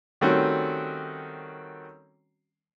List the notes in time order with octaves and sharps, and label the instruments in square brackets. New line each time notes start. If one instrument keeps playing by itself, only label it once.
[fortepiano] D#3 G3 A3 C4 C#4 F#4